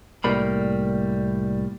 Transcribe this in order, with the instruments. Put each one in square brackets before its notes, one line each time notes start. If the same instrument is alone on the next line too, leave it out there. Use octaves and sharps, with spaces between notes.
[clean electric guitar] C2 A2 G3 A#3 B5